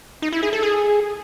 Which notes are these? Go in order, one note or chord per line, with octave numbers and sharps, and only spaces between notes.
D#4
E4
G#4
A4
G#4